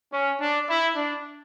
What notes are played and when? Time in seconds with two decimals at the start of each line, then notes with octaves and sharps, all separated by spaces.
0.13 C#4
0.41 D4
0.69 E4
0.97 D4